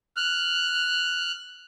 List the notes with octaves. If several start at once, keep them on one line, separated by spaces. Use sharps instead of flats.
F6 F#6